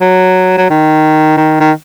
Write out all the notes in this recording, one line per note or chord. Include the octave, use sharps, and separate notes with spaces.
F#3
F#3
D#3
D#3
D#3